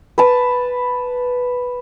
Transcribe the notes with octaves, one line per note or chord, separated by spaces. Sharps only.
B4 A5